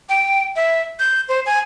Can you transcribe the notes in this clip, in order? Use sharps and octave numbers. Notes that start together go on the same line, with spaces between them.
G5
E5
G6
C5
G#5